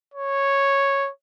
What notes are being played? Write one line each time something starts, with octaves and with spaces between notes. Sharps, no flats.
C#5